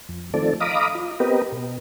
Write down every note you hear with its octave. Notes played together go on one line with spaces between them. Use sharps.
F2
D#3 F3 A3 C4 A4 D5
D#5 F5 A#5 B5 D6 D#6
F4
B3 C4 G4 A#4 B4 D#5
B2